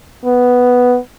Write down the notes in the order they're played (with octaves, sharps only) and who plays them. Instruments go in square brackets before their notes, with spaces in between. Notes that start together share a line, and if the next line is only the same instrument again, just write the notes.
[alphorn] B3